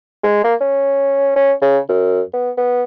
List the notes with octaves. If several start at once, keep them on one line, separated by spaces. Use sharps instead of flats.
G#3
A#3
C#4
C#4
C#3
F#2
B3
B3